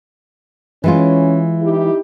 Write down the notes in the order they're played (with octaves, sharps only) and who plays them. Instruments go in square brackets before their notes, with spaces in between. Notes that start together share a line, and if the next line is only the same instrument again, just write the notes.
[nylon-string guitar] E3 G#3 F4 [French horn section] C#4
[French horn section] D#4 E4 G4